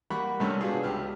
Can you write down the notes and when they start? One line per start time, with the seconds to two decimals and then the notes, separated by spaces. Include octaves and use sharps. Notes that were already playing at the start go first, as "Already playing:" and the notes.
0.10 G3 A#3 F#5 B5 C#6 F#6
0.40 G2 C3 G3 A3 C#4
0.61 B3 D4 F4 F#4 G#4
0.83 C#2 G4 F6